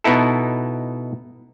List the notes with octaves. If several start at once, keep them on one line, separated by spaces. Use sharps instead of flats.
B2 B3 D#4 E4 A4